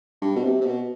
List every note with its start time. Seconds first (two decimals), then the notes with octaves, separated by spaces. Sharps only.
0.22 G2
0.36 B2
0.44 C3
0.61 C3
0.66 B2